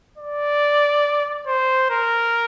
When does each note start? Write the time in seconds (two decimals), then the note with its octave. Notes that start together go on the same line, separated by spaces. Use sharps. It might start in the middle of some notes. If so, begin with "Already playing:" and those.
0.18 D5
1.47 C5
1.90 A#4